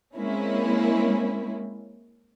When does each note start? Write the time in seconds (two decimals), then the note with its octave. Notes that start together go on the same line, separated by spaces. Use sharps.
0.17 G#3 A#3 C4 C#4 E4